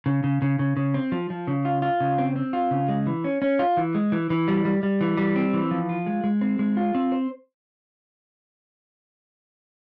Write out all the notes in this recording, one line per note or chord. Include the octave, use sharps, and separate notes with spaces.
C#3
C#3
C#3
C#3
C#3
C4
F3
F3
C#3
F4
F4
C#3
C4
C4
F4
C#3
G#3
E3
C#4
C#4
F4
E3
G#3
E3
E3
G3
G3
G3
E3
G3
C4
E3
F3
F4
G#3
G#3
C4
G#3
F4
C4
C5